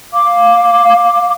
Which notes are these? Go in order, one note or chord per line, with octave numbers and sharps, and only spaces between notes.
F5 D6